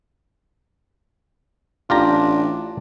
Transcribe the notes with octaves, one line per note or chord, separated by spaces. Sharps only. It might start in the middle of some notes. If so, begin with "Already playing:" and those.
A1 D4 F4 G4 A#5